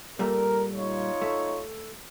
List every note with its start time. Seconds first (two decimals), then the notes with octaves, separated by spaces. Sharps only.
0.19 A#2 G3 A3 A#4
0.75 D#4 F4 C#5
1.22 A3